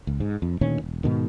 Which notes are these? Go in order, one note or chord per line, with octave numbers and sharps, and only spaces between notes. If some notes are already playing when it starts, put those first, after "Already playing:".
C#2
G#2
F2
D2 A#2 D#3 C#4
E1
G#2 B2 D#3